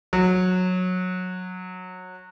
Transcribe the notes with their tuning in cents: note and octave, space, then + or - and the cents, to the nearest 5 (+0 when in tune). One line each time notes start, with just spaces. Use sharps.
F#3 -15